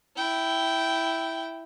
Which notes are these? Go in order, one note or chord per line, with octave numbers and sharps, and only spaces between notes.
E4 G5